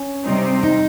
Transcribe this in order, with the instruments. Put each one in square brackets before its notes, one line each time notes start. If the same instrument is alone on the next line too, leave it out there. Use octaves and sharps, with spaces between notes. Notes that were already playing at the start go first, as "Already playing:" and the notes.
Already playing: [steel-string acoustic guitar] C#4
[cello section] C3 G3 C4 D#4
[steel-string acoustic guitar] D#4